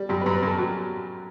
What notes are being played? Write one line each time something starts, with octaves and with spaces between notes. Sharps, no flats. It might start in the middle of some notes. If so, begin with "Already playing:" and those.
Already playing: G3
F#2 G4
B4
F#2
B4
F#2 A4
F#3 G4